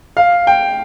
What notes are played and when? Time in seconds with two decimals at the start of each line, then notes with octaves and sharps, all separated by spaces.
0.17 F5
0.47 G5